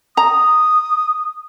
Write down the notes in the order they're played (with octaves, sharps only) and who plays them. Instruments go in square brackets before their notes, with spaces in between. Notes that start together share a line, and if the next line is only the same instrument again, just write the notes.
[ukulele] A#5 [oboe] D#6